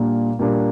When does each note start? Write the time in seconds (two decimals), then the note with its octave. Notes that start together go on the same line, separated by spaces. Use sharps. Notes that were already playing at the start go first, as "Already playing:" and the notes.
Already playing: A#2 G3 A#3 D4
0.39 A#2 G3 A#3 D4